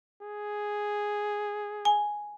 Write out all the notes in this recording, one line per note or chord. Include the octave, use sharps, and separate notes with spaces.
G#4
G#5